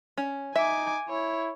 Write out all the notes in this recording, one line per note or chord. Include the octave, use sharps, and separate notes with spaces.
C#4
D#4 E5 G#5 D6
E4 C#5